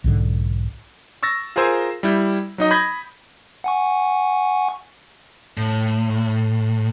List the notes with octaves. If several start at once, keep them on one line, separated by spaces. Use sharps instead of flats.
B1 G#2 D3
C#6 E6 A6 A#6
F4 G#4 A#4 C5 G#5 E6
G3 E4 G6
F#3 D#4 D#5
B5 D#6 G6 G#6 A#6 B6
F#5 G#5 C#6
A2